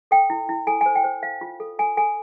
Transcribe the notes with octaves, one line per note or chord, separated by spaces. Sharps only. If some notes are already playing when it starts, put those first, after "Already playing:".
A4 G5
E4
E4
A4 G#5
G#5
C5
G5
C5
C5 F5
F4
A4
A4 G#5
A4 G#5